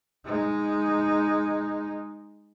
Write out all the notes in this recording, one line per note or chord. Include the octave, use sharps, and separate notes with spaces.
G#3 D#4